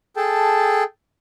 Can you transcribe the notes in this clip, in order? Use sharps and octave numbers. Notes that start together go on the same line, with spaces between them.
G#4 A4 G5 A5